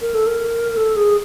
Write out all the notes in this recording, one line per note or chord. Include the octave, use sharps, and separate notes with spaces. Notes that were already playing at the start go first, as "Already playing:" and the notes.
A#4
A4
A#4
A4
G#4